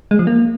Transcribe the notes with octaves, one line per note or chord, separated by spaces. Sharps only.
G#3
F3
A#3